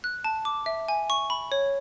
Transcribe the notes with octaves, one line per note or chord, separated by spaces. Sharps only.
F#6
A5
D6
E5
G#5
C#6
B5
C#5